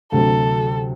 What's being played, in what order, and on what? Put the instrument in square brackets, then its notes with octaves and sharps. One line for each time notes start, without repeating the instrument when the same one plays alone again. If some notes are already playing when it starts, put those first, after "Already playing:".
[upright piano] D2 C3 F#3 [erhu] A4